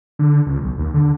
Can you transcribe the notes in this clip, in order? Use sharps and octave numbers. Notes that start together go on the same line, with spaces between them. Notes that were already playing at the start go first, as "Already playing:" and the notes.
D3
C#2
B1
D#2
D3